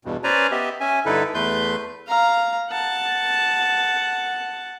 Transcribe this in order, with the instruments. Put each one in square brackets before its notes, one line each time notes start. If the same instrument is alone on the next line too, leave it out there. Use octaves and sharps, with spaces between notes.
[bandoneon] E2 G2 B2
C#4 B4 C5 D5 G#5 A#5
B3 G4 D#5 E5
C#4 E5 G#5
G2 D3 D#4 E4 A4 B4
E2 A3 B4 C6 G6
[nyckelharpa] F5 A#5
F#5 A5